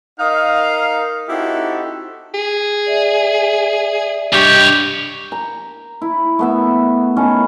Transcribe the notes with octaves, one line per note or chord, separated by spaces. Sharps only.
D#4 A#4 D#5 F5
C4 D#4 E4 F#4 G4 A4
G#4
D5 E5
G2 D4 G4 C#5 D#5
A#5
E4
A3 B3 E5
D#3 C#4 E4 A4